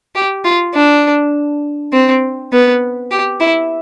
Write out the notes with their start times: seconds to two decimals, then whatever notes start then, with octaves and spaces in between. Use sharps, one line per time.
0.15 G4
0.45 F4
0.74 D4
1.93 C4
2.52 B3
3.11 G4
3.40 E4